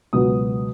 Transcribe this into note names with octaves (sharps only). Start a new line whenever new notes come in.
C#2 B2 F#3 B3 D#6